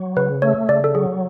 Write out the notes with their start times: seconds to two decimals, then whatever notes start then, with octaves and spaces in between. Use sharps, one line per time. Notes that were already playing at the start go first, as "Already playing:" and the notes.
Already playing: F#3
0.17 C#3 B4
0.42 A3 C#5
0.69 C#3 D5
0.84 A4
0.95 F#3 G#4